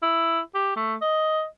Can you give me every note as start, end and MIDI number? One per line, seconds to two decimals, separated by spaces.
0.02 0.40 64
0.55 0.71 67
0.76 0.96 57
1.02 1.45 75